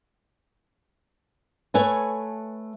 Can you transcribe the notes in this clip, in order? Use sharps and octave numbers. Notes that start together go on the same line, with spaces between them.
A3 B4 C#5 G#5